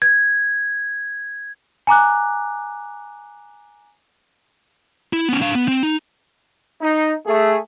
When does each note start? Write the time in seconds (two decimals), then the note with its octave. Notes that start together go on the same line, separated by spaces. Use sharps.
0.02 G#6
1.87 G#5 A#5 D6 F#6
5.13 E4
5.29 B3 C#4
5.42 D4 F5
5.55 B3
5.68 C4
5.83 D#4
6.81 D#4
7.27 A3 G#4